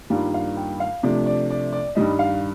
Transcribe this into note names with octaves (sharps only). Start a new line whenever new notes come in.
G2 D#3 G3 A#3 F4 D5
F5
G5
F5
C3 F3 A3 D4 D5
D5
D5
D5
G2 D#3 G3 D#5
F5